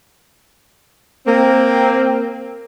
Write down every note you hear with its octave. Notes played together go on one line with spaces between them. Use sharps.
A#3 C4